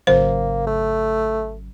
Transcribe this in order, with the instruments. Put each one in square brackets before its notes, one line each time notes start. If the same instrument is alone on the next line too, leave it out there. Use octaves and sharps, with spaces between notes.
[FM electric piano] G#1 C#3 F#3 [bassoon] A#3 [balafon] C5
[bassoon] A3